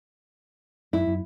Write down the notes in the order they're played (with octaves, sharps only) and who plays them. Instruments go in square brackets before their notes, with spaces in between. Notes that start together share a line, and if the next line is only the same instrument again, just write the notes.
[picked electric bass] F#2 [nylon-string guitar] E4
[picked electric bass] F#2